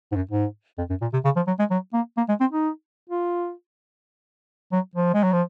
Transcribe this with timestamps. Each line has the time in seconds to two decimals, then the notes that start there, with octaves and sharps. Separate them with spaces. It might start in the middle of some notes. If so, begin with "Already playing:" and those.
0.12 G#2
0.16 F#2
0.31 G#2
0.78 F2
0.89 F#2
1.01 A#2
1.13 C3
1.25 C#3
1.36 F3
1.47 F#3
1.59 G#3
1.71 F#3
1.94 A#3
2.17 A#3
2.29 G#3
2.40 C4
2.52 D#4
3.10 F4
4.72 F#3
4.95 F3
5.14 G#3
5.23 F#3
5.32 F3